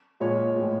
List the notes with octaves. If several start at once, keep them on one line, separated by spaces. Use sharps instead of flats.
A#2 F3 G#3 C#5
A2 F3 G#3